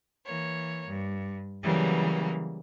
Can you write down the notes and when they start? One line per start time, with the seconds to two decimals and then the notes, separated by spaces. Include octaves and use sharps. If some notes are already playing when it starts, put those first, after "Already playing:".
0.25 E3 A#3 C#5
0.88 G2
1.63 C#3 E3 F#3 G3 A#3 B3